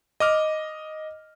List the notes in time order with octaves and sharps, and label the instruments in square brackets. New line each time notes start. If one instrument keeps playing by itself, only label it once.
[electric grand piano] D#5 D6 F6